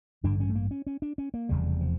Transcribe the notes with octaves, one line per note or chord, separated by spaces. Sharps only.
A1 G2 D3 D4
C#4
A3
A#3
C#4
C#4
D4
C#4
A#3
F1 E2 C#3 G3
F3